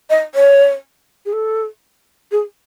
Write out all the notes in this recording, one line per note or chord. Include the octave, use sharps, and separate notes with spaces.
D#5
C#5
G#4
A4
G#4